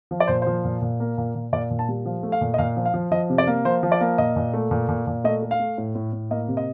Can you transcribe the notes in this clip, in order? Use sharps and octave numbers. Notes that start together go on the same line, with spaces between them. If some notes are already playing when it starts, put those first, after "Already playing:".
F3
D5
A#2 C5
F3 C5
A#2
A#2
A#3
A#2
A#2
A#2 D5
A#2
A5
G3
F3
A3
F5
A#2
D#5
A#2 F5
F3
F5
F3
F3 D#5
C3
D5
A#3
F3 C5
F3
D5
A#3
A#2 D#5
A#2
A3
A#2
A#2
A#2
A3 D#5
A3
F5
A3
A2
A2
A2
A#3 D#5
C3
D#5